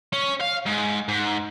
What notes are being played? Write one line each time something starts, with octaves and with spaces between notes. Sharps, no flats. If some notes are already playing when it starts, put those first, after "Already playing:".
C#4
F5
G#2
G#2